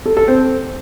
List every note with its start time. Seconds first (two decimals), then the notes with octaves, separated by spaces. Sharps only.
0.06 A4
0.17 A4
0.28 C4